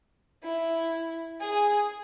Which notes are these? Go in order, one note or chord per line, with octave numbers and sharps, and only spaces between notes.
E4
G#4